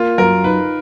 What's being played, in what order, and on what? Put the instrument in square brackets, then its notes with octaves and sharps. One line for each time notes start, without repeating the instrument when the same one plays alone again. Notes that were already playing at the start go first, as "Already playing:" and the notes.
Already playing: [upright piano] A#3 [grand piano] F4
[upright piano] F#2 [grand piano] A#4
[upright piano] D#4 [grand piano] B4